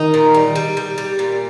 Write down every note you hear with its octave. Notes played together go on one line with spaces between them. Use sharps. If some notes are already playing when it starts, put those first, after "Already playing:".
Already playing: D#3 D#4
A#2
G3
G3
G3
G3
A#2